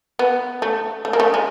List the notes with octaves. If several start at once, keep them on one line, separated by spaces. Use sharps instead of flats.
B3
A3
A3
A#3
A3
G#3